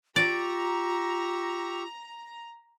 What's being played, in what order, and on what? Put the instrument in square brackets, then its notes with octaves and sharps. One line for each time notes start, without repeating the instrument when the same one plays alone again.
[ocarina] F4 [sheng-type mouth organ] G4 C#6 E6 [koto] D5 [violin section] A#5